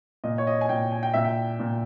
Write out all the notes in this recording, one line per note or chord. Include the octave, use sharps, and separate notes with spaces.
A#2 D#5
C#5
D#5
G#5
A#2 G5
G#5
G5
A#2 E5
G5
A#2